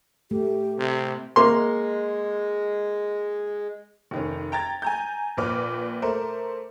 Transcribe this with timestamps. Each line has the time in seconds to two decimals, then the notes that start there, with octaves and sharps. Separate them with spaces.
0.31 A3 G4
0.79 C3
1.36 G#3 A#3 C6
4.11 F1 D#3 C#4
4.52 G5 A#5 G#6 A6
4.82 G#5 A#5 G6
5.37 A#1 A#2 B4 D6 F6
6.02 A3 A#4 C5